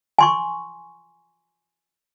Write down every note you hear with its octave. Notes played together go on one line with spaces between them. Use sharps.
G#5 C6 C#6